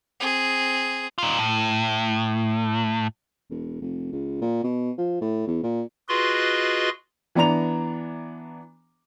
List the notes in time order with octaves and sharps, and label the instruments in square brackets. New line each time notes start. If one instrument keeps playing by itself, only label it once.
[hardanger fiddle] C4 G#4
[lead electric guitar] D#4 F4
A2
[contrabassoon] E1
F1
C#2
A#2
B2
F3
A2
E2
A#2
[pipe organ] F4 F#4 G#4 B4 D#5 C6
[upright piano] E3 B3 D4 A#5 F7